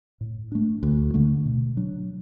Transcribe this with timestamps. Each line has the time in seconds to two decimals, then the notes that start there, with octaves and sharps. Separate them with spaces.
0.21 A2
0.52 A3 D4
0.83 D2
1.14 D3 A3 D4
1.46 B2
1.77 F#3 D4